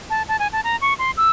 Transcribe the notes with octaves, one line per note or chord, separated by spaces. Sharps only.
A5
A5
G#5
A5
A#5
C#6
C6
E6